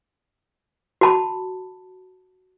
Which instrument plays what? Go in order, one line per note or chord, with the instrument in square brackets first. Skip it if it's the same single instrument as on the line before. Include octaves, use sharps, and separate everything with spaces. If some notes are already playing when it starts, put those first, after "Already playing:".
[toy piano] F#4 A5 B5